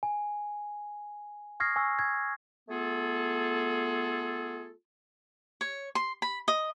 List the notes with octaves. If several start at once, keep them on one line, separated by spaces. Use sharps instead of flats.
G#5
C#6 D#6 F6 G#6 A#6 C7
G#5 C#6 E6
G#6
A3 B3 F4 G#4 A4
C#5
C6
B5
D#5